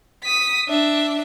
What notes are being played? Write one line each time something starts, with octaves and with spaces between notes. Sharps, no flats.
D#6 B6
D4 E5